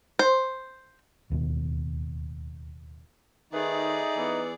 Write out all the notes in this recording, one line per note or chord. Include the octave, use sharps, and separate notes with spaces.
C5
D1 D#2 B2
D#3 A3 D#4 G#4 B4 D5
E3 B3